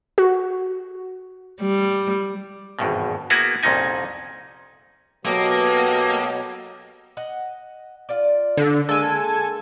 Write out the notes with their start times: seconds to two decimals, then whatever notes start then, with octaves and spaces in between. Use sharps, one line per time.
0.18 F#4
1.61 G3
2.79 G#1 E2 G2 B2
3.30 A#3 B3 E4 F#4 G#4 B4
3.63 C2 F2 A#2 C#4 D#4 G#5
5.25 B2 F#3 A#3 B3 F#4 G4 A4 D#5
7.17 D#5 F#5
8.09 F4 D5
8.57 D3
8.89 G#3 A#3 A4 G#5